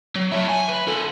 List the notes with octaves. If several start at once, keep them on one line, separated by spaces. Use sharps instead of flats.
F#3
E4 C#5
G#5
B4
D#3 A4